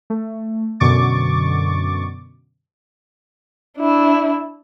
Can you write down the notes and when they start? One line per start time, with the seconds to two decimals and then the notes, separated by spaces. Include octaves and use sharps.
0.10 A3
0.80 F#2 B2 D3 C#6 D6 A6
3.78 D4 E4